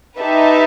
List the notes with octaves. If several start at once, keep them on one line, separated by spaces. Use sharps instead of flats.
D#4 G4 B4 E5 A5